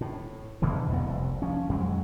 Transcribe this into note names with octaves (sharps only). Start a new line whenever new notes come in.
A2
E2 B2 D3 E3
B1 F2 G#2 B3
F1 C2
F3 C#4
F2 F#3 G#3